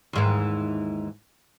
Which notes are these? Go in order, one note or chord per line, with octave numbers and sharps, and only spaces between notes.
D#2 G#2 E3